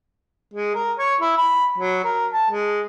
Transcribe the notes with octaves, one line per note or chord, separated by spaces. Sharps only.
G#3
A#4
C#5
E4
B5
F#3
A#4
A5
G#3